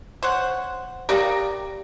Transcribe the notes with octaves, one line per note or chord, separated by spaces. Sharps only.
C5 C#5 F#5
G4 A#4 D5 F5 G5 A#5